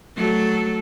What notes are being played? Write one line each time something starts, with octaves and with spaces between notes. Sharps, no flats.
F#3 A3 A4